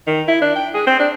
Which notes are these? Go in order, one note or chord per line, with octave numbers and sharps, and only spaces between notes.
D#3
E4
D4
G5
G#4
C4
D4